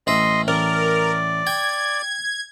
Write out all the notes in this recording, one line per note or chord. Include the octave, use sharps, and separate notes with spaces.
A1 D#5 E5 C6
A1 A#4 D5
G5 G#6